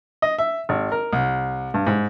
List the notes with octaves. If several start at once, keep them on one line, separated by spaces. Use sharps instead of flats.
D#5
E5
G#1
A#4
C2
G2
G#2